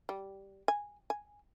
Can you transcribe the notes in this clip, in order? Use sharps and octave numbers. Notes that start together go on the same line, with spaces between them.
G3
G#5
G#5